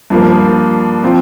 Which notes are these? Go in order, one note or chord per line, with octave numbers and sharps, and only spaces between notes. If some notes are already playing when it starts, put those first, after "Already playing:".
G2 F3 A#3
F3 C4 F4